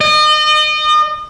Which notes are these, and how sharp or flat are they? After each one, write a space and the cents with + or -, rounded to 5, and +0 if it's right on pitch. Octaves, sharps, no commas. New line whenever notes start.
D#5 -35